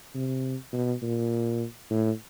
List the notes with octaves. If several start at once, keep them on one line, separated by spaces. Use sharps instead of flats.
C3
B2
A#2
A2